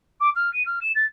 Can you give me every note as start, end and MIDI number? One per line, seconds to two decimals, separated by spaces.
0.20 0.29 86
0.35 0.51 89
0.53 0.63 99
0.65 0.78 89
0.81 0.90 100
0.94 1.05 93